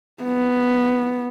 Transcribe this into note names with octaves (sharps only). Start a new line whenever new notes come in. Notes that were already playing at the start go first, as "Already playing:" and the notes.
B3